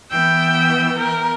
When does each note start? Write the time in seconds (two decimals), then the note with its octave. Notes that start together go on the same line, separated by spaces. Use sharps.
0.12 E3 B3 G5 E6
0.98 A#4